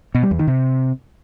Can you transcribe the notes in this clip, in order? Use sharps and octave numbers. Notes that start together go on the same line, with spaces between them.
B2
G3
E2
D#3
C3